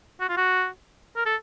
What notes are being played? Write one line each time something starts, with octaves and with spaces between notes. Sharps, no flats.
F#4
F4
F#4
A#4
A4